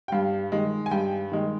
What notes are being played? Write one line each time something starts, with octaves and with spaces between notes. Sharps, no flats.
G5
G2 F5
D#3 G#3
G#5
G2 G5
D#3 G#3